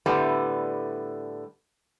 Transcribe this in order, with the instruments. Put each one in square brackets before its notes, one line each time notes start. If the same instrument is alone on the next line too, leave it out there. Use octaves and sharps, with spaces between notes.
[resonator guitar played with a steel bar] A2 D3 G3 A3 B3